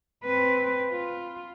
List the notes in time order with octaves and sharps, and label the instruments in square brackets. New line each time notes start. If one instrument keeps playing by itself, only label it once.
[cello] C4 B4
F4